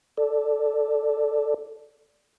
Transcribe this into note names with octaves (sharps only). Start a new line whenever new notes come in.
A4 D5